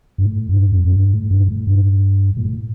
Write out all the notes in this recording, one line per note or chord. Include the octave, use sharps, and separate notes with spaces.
G2
A2
G2
F#2
F#2
G2
A2
G2
A2
G2
A#2
A2